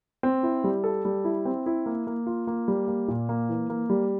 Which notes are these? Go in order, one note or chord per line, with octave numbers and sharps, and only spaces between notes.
C4
E4
G3
A4
G3
E4
C4
E4
A#3
A#3
F4
A#3
G3
A#3
A#2
A#3
E3
A#3
G3